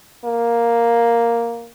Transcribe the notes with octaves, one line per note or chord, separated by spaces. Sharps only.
A#3